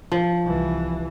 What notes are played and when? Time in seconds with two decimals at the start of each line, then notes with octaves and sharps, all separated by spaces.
0.12 F3
0.44 C2 E3